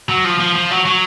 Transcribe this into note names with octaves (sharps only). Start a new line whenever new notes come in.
F#3
F3
F3
F3
F#3
F#3